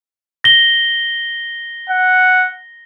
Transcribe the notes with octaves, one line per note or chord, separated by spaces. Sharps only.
A#6 G7
F#5